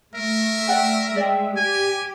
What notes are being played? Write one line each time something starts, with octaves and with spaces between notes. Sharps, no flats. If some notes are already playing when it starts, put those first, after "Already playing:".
A3 A#4 E5
D5 F#5 G5
G#3 D5 G5
G4 G#5